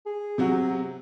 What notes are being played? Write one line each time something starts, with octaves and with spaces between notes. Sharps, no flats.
G#4
C3 F#3 F#4